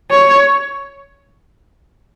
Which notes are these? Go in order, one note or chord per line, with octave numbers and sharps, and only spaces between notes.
C#5